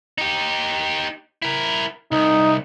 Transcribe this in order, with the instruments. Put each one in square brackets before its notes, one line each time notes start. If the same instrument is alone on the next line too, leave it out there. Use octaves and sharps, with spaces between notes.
[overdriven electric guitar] D#4 G4
E4 A#4
[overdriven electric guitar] C2 [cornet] D#4